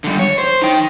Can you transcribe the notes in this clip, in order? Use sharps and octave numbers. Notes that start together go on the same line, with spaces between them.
D3 G3
C#5
C5
D#4 G5